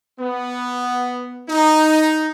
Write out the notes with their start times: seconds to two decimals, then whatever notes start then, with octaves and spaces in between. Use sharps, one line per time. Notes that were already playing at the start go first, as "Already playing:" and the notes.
0.19 B3
1.49 D#4